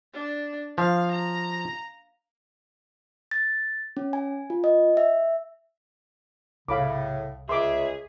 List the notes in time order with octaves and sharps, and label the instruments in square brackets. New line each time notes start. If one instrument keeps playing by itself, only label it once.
[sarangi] D4
[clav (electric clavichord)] F3 [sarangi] F5
[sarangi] A#5
[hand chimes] A6
C#4
G#5
F4
D#5
E5
[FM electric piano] C2 [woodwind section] A2 C#3 [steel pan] F5 B5 D6
[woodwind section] C#2 E5 [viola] G#4 [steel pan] C6 D6